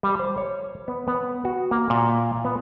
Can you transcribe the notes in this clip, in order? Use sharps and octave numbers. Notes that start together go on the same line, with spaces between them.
G3
C5
C#5
B3
B3
F#4
A#3
A#2
B3